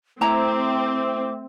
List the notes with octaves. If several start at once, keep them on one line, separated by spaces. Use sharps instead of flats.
A3 C4 E4 E5 A#5 D6